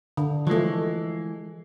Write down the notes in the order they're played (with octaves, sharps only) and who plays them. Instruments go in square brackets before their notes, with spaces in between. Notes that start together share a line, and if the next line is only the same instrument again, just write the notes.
[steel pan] D3
[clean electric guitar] E3 G#3 [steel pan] F3 A3